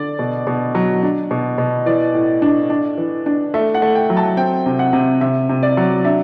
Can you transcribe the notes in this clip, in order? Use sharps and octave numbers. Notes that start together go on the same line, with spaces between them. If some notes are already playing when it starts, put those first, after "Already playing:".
Already playing: D3 D5
B2
B2
F#3
D4
B2
B2
E3 D5
A2
D4
D4
E3
D4
A3 E5
F#5
A3
G5
F#3
A5
C4 G5
C3
F#5
C3
C3 E5
C3
D5
F#3
D4 E5